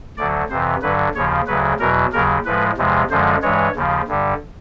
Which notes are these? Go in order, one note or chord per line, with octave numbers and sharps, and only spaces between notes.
D2 D3 F#3 D5
F2 C3 E3 C5
G2 D3 F#3 B4
D#2 C#3 F3 C#5
D2 C#3 F#3 B4
E2 B2 F#3 A#4
D#2 C#3 F#3 A#4
A2 F3 G#3 B4
E2 C3 F3 G#3
F#2 D3 F3 G#3 C5
G2 E3 G#3 C#5
D#2 C#3 F3
G2 D3 G3